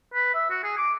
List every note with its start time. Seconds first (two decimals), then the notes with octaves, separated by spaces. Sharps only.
0.14 B4
0.34 E5
0.50 F#4
0.64 G#4
0.78 D6